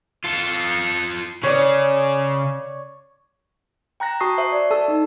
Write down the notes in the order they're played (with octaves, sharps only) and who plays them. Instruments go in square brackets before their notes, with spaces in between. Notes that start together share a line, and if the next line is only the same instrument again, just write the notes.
[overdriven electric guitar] F4 A4
[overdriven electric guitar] C#3 [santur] C#5 D5
[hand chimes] G5 A#5 F#6 A#6
F#4 A5 A#5 C#6 D#6 C7
C5 E5 C#6
D5
A4 A5 E6
D#4